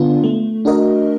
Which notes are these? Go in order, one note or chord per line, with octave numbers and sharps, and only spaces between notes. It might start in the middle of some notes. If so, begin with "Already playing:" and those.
Already playing: D3 B3 D4 F4
A3
D4 F#4 A#4 D#5